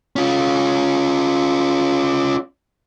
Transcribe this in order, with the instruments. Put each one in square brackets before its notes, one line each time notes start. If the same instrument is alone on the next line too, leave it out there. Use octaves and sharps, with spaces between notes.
[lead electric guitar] C#4 F4